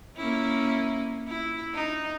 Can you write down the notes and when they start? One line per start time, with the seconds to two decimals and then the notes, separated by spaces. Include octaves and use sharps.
0.17 A#3 C#4 E4
1.28 E4
1.74 D#4